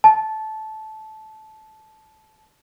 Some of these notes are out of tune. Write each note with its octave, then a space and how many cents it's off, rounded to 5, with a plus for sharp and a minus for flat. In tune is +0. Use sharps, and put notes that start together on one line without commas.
A5 -15